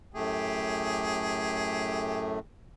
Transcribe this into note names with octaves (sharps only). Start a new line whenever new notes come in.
F#2 A2 A3 G4 G#4